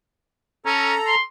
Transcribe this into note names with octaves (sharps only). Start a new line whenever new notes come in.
C#4 A4 A#5
C6